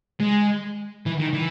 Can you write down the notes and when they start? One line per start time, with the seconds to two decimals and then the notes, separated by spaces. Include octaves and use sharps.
0.20 G#3
1.06 E3
1.20 D#3
1.34 E3